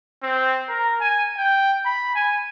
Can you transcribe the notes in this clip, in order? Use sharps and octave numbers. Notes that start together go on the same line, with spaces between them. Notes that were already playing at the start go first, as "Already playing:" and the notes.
C4
A#4
G#5
G5
B5
G#5